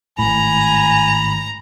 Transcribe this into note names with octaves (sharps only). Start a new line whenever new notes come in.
G#1 A2 G#5 A#5 B5